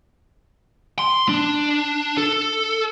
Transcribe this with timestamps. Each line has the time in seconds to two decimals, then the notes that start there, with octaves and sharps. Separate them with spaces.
0.99 C6
1.29 D4
2.17 A4